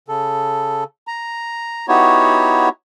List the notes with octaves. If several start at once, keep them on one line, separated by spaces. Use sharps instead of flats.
C#3 A4
A#5
B3 D#4 E4 F#4 G4 C#5